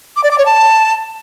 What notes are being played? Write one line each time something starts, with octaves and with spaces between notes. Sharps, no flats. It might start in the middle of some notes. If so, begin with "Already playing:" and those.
D6
D5
D6
C#5
A5